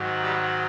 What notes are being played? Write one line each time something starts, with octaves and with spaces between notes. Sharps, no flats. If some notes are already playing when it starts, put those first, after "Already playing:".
Already playing: G#2 D#3 F#3
G3 G4